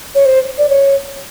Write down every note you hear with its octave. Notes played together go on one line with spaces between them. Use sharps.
C#5
C5
D5
C#5